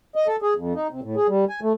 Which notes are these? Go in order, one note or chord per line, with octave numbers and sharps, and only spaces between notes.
D#5
A4
G#4
F2
D#4
C3
A2
G#4
G3
G#5
A3